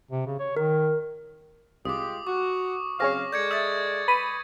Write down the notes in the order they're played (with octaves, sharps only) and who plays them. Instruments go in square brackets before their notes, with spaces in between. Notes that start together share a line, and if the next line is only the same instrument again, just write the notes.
[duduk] C3
C#3
C#5
[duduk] D#3 [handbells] A#4
[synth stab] C2 [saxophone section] G#3 F4 G4 [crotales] D6 D#6
[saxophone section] F#4 [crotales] C#6
[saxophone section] C#3 F#3 F5 [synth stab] C4 G#4 C#5 [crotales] C#6 A#6
[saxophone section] G#3 A4 D5 [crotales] G6 G#6 C#7
[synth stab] E5 [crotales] D#6 G6 A6
[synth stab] B4 B5 D#7